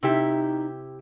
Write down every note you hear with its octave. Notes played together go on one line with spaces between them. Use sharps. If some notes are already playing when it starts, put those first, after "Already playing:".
C3 D#4 E4 G4